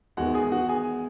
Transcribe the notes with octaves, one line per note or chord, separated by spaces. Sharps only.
E2 D#3 G#3 F#4 F#5
G#4 G#5
F#4 F#5
G#4 G#5